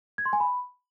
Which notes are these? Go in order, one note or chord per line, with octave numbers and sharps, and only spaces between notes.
G#6
C6
G#5
B5